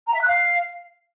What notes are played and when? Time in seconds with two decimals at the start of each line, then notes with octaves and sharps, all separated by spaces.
0.08 A#5
0.14 E5
0.21 F#6
0.27 F5